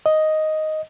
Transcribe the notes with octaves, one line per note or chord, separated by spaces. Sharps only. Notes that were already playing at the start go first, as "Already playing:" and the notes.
D#5